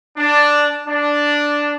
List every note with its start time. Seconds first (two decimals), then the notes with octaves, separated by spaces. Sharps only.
0.17 D4
0.88 D4